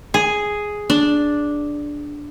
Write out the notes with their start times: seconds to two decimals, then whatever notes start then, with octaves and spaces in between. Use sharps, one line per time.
0.14 G#4
0.90 D4